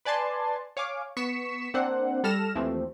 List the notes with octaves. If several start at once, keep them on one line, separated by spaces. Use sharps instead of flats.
B4 D5 G#5 A5 C6
C#5 F5 G#5 D6
B3 C#6 B6 C#7 E7
A#3 C4 D4 C5 F#5
G3 A4 F6 A#6 E7
D#2 E3 F3 A3 C4